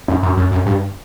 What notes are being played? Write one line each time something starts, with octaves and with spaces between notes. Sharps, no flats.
F#2
F#2
F#2
F#2
G2